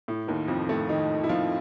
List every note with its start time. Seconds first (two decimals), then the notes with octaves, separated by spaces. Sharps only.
0.08 A2
0.28 D#2 D#3
0.48 F2 F3
0.69 A2 A3
0.89 D#3 D#4
1.24 E4
1.29 F3 F4